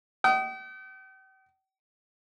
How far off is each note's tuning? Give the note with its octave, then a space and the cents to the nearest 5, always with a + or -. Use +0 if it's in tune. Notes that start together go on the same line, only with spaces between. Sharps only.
G5 -45 D#6 +0